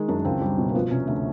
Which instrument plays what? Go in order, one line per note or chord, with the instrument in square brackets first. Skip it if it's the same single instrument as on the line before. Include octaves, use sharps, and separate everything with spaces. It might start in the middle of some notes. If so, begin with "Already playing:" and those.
Already playing: [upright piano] D#3 G#3
[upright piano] F#2 [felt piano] D4
[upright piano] C#2 [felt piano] C4
[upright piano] G3
B2
[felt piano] A#3
[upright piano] F3 [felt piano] B3
[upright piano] C3 [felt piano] C#4
[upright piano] D2 [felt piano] A3